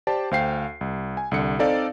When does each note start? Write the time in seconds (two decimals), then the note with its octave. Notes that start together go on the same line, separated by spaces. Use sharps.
0.07 G4 C5 D5 A5
0.31 D2 C5 F5 G5 C7
0.81 C2
1.17 G#5
1.31 C2 D3 C#7
1.59 C4 D#4 A4 D5 F5